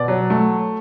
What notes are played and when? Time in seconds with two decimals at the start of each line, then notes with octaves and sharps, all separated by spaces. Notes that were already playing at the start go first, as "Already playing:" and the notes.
Already playing: B2 D5
0.08 F#3
0.30 A3